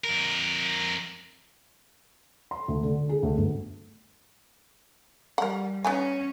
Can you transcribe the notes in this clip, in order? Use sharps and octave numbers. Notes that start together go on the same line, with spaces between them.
F2 A#4
C6
D2
D3
G#4
D2
G1
G3 A#4 F#5
B3 C#4 D#4 G#5